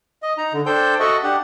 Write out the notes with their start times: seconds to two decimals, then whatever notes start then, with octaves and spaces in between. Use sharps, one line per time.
0.22 D#5
0.38 D#4 A#5
0.53 D3
0.66 D4 A4 C5 G5 G6
1.00 F#4 A4 D#5 E5 F#5 C#6
1.23 D4 G4 F#5